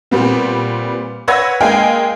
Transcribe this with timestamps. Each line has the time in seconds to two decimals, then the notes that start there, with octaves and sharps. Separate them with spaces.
0.11 A#2 G3 B3 C4
1.28 B4 C#5 F#5 E6 G#6 A#6
1.61 G#3 A#3 F5 G5 G#5